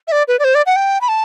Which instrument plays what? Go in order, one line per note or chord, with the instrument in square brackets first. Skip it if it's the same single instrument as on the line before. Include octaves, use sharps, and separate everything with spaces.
[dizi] E5
D5
B4
D5
C5
D5
F#5
G5
B5
A5